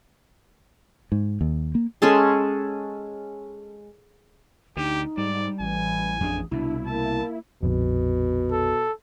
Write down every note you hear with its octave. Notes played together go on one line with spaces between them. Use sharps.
G#2
D#2
A#3
G#3 C#4 A4 C6
D2 D3 D#4 G4
G#2 G3 D5
A1 E3 G#5
F2 D4 G#4
C2 B2 D4 E4
A#3 A5
A#1 F2 B2
A4